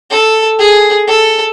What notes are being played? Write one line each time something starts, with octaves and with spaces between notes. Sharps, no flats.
A4
G#4
A4